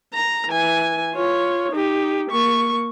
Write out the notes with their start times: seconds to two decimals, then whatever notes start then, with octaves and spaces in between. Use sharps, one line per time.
0.14 A#5
0.49 E3 G#5
1.14 F4 C#5
1.72 D#4 G4
2.31 A#3 C#6